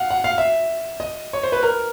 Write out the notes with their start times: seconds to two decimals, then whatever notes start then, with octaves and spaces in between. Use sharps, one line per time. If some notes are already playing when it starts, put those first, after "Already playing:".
Already playing: F5 F#5
0.10 F#5
0.24 F5
0.38 E5
1.00 D#5
1.33 C#5
1.43 C5
1.52 B4
1.63 A#4